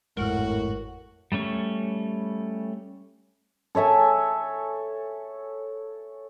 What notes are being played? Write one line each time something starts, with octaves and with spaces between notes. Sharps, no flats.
G#1 F2 A2 G#3 F#4 A#4
G3 A3 C#4 C#6
A4 C#5 E5 G#5